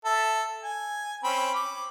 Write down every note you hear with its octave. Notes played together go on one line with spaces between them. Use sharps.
A4 E5
G#5
C4 C#4 B5
D6